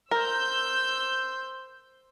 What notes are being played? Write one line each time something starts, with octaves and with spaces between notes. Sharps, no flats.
A#4 C5 E6 G6